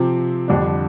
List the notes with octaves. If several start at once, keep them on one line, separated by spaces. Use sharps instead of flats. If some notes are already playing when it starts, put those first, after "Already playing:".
Already playing: C3 F3 C4 G4
F2 D3 G3 D4